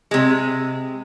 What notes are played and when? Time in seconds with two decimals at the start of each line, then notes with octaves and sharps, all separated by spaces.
0.11 C3 G#3